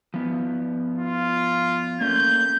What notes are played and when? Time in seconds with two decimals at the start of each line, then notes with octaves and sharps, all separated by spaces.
0.14 F3 B3
0.99 F4
2.01 A3 A#3 C#4 G6